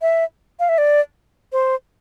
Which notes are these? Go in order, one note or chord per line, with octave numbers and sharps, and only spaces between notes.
E5
F5
E5
D5
C5